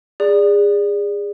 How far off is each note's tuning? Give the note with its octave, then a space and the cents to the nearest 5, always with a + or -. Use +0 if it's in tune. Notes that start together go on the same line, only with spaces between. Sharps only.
G#4 -30 D5 +0